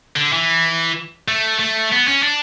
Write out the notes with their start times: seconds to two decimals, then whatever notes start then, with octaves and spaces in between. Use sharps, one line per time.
0.16 D3
0.33 E3
1.28 A3
1.59 A3
1.92 B3
2.08 C#4
2.23 D4